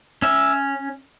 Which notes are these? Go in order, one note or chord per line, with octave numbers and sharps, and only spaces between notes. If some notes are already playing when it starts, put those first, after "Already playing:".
C#4 E5